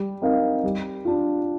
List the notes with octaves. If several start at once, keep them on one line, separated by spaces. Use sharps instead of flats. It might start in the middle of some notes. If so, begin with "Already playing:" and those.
Already playing: G3
C4 D#4 A#4 F5
G3
D4 F4